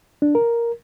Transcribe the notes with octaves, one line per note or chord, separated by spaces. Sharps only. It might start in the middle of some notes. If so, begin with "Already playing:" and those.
D4
A#4